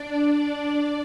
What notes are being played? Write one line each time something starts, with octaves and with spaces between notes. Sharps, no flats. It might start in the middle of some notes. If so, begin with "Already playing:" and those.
Already playing: D4 D5
D4 D5